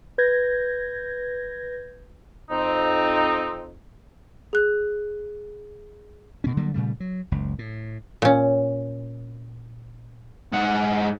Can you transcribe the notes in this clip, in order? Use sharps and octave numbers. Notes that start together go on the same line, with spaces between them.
B4 G6 G#6 A#6
F2 C4 D#4
G#4 F#6
G2 B2 C#4
D3 F#3 G3 A#3
A#2 C#3 G3 A3
F#3
F#1 C#2
A2
A#2 C#4
G#2 F#5